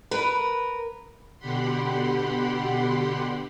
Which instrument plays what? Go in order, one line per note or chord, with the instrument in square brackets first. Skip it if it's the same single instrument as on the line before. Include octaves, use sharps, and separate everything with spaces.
[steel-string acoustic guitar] A#4 [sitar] B4
[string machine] B2 D3 G4 F#5 B5 C6